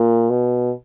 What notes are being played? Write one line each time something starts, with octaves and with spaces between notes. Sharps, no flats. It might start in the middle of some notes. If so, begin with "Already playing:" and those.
Already playing: A#2
B2